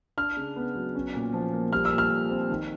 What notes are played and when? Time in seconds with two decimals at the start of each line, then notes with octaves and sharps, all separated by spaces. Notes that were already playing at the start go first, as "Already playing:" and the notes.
0.17 D4 F6
0.37 C#3
0.56 B3
0.75 F#3
0.95 C#4
1.14 A#2
1.33 F3
1.53 A#3
1.72 G3 F6
1.85 E6
1.92 A#2
1.98 F6
2.10 A#2
2.30 C4
2.50 D#3